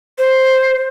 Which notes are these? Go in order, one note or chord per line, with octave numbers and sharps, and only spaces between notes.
C5